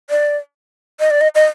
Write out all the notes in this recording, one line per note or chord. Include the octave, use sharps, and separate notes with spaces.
D5
D#5
D5
D#5
D#5